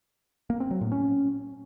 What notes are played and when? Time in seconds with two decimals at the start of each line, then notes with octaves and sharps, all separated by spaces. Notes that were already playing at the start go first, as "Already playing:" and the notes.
0.50 A#3
0.60 C4
0.71 F#3
0.81 A2
0.92 C#4